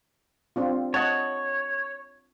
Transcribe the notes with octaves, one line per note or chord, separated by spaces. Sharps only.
C4 D4 F4
C#5 D#5 F#5 A5